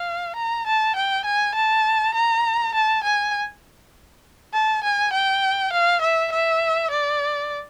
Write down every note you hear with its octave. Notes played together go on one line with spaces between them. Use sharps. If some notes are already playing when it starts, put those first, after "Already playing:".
Already playing: F5
A#5
A5
G5
G#5
A5
A#5
A5
G#5
A5
G#5
G5
F5
E5
E5
D5